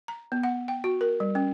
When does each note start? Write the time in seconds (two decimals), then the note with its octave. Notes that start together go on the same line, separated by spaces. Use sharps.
0.08 A#5
0.32 B3
0.43 F#5
0.68 G5
0.84 F#4
1.01 A#4
1.20 G3
1.35 C#4